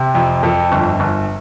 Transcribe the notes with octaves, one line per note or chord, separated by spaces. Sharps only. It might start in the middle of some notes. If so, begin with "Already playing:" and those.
Already playing: C3
F2
F2 A4
G1
G1